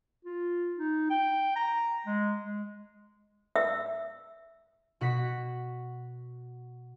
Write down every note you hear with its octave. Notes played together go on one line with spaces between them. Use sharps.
F4
D#4
G5
A#5
G#3
G#3
E5 E6
B2 F#4 F#5 B6